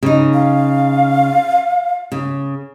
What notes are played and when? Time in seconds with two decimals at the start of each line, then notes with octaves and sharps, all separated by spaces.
0.03 C#3 D#4
0.34 F5
2.12 C#3